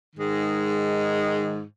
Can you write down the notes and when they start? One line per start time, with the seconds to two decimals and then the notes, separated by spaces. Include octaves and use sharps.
0.16 G#2 D#3 G#3